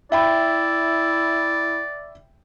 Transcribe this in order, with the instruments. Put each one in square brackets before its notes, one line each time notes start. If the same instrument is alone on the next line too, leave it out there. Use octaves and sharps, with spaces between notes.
[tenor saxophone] E4 [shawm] D5 [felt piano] E5 G5 B5